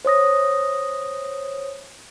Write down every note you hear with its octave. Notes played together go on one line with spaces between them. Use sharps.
C5 C#5 D#6 A#6